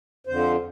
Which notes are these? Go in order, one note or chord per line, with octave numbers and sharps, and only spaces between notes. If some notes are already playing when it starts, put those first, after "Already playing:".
F2 D3 F3 C5